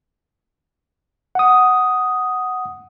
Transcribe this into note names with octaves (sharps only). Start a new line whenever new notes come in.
F#5 D#6